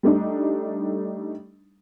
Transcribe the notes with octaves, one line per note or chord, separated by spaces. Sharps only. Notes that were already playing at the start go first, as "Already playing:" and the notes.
G3 A3 D4 D#4